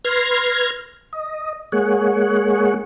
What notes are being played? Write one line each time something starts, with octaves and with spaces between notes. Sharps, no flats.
B4 C6 F6 G#6 A#6
D#5
G#3 A#3 G#4 C#5 F#5